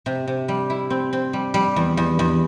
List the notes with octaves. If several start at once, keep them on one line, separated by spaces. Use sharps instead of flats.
C3
C3
G3
E4
C4
C4
G3
G3
E2
E2
E2